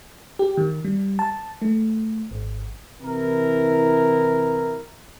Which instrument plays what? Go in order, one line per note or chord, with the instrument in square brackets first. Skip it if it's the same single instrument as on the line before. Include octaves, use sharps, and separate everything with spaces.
[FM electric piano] G4
D#3
G3
A5
A3
G#1
[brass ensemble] C3 E3 E4 A#4